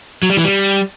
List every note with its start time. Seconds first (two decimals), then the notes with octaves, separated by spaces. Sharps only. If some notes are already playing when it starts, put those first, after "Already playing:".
0.23 F#3
0.30 G3
0.37 E3
0.44 G3